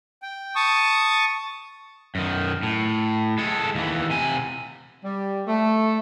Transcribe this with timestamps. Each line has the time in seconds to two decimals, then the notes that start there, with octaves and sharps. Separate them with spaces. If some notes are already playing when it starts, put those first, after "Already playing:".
0.22 G5
0.55 A5 C#6 D#6
2.15 F#2 D#3
2.63 A2
3.38 G#3 A4
3.75 D#2 E3
4.10 C3 G#5
5.04 G3
5.47 A3